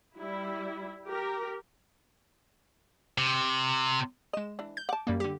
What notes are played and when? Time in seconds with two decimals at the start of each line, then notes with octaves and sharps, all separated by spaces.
0.18 G3 E4
1.06 G4 A#4
3.18 C3
4.33 G#3 D#5 E7
4.59 E3 D4
4.77 G6
4.89 F#5 A5 D6
5.07 F#2 G3 A#3
5.20 D3 G4